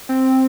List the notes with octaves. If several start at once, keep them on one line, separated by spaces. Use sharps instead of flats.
C4